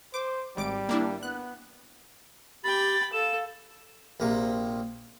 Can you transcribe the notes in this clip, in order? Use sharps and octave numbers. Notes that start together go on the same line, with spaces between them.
C5 D6
G#1 G3 D6 D7
A#3 D4 E4
B3 F#6
G4 G5 B5 A6
A4 F5 E7
A#1 C3 A#3